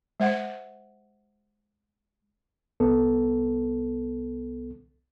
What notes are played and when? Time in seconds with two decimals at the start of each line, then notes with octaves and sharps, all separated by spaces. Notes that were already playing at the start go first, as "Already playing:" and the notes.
0.20 G#3 C5 F#5
2.80 C2 B3 A4